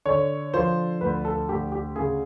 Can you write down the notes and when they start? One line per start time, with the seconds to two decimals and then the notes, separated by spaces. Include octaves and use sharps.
0.06 D3 C#5
0.54 F3 C5
1.01 D2 B4
1.25 A4
1.49 D2 G4
1.72 G4
1.96 C#3 G#4